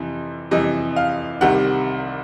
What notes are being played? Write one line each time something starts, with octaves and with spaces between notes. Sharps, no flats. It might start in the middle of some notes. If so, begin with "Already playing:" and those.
Already playing: F2 C3 E3 G3
F2 C3 E3 G3 D#5
F5
C2 C3 D#3 G3 F#5